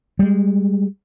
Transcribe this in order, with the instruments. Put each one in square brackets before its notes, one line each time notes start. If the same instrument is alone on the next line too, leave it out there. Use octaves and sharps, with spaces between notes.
[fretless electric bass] G3 G#3